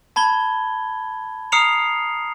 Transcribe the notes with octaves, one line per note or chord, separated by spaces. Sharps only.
A5 B5 G#6 G7
A#5 D#6 F6 C7 C#7 F7